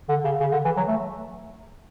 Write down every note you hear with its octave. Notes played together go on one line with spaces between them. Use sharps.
D3
C#3
C#3
D3
E3
F#3
A3